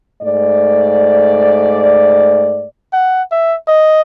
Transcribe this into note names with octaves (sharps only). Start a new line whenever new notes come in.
G#2 A3 D5
F#5
E5
D#5